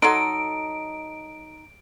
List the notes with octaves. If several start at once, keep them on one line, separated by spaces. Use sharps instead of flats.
F#3 D#4 A4 C6 D7